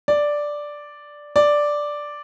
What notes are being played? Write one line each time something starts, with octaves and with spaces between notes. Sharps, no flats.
D5
D5